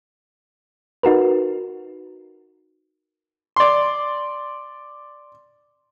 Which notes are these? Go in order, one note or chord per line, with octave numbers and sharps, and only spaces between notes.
D#4 F#4 A#4 B4
D5 C6